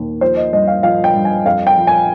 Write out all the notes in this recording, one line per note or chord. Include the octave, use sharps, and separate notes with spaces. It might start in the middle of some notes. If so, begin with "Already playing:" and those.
Already playing: D#2
F3 C5
D#5
G2 D#5
F5
F3 F5
G5
G2
G#5
F2 F5
G5
F3
G#5